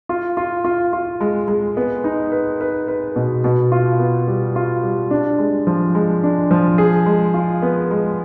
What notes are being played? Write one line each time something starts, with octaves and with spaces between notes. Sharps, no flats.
F4
F4
F4
F4
G#3
G#3
B3
D#4
B4
B4
B4
B2
B2
F4
B3
G3
F4
G3
D4
G#3
F3
G#3
D4
F3
G#4
G#3
F4
B3
G#3